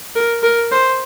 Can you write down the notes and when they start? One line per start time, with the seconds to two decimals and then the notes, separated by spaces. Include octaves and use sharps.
0.16 A#4
0.43 A#4
0.72 C5